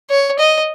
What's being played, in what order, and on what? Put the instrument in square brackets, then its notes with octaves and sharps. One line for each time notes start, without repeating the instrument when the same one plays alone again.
[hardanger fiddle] C#5
D#5